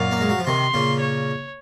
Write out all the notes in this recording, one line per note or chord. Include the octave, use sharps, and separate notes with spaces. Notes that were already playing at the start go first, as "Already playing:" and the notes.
Already playing: F#2 A#2 F5
A#3
G#3
F#3
F3
C3 D#3 C6
A#2 C#3
C#5